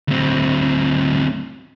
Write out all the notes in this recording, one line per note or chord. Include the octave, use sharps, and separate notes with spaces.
D2 C4